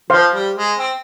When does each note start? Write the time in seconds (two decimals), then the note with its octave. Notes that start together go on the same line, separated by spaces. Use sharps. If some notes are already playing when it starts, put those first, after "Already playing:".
0.10 F3 C5 F5 C6
0.33 G3
0.56 G#3
0.78 C4